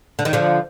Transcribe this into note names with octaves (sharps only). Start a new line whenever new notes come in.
D3
D#3
D3 F3